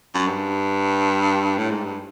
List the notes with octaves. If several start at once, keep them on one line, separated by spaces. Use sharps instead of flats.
F#2
G2
A2
G#2
G2